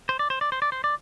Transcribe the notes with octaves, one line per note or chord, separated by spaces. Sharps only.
C5
D5
C5
D5
C5
D5
C5
D5